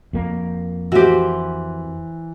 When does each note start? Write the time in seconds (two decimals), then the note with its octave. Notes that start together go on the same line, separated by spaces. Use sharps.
0.13 F2 A#3
0.92 E3 F#4 G4 C5